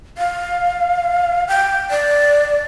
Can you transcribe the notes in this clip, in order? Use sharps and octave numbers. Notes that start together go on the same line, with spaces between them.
F5
G5
D5